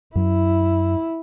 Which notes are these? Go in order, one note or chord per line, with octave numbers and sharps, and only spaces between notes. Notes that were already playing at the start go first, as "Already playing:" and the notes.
F#2 F#3 E4